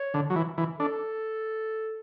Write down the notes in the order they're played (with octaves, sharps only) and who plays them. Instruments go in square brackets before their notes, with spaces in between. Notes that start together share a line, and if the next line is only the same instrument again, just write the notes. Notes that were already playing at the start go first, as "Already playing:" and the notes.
Already playing: [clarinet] C#5
[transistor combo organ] D3
F#3
E3
E3
[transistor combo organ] D4 [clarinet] A4